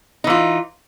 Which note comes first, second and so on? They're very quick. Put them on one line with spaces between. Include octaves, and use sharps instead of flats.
D#4 E3 F4